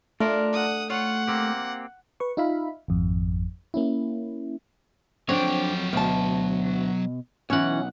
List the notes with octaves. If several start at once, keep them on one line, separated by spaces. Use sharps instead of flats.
A3 D4 F4 A#4
F#5 D#6
F4 C#5 F#5
A#3 C4 G4
B4 C#6
D#4 F4 E5 F5 B5
G#1 F2
A#3 C#4 E4
F2 F#3 C4 D4 C#5 G5
D2 B2 A5
B1 E3 C#4 F#5